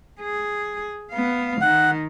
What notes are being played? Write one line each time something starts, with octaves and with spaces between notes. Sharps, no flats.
G#4
B3 F5
D#3 F#5